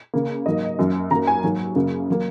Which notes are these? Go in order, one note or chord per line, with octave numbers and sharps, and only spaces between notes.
C#3 A#3
G#2 F#3 A#3 D#5
F#2 F#3 A#3
F#2 F#3 A#3 A#5
G#5
G#2 F#3 A#3
F#2 C#3 A#3
F#3 A#3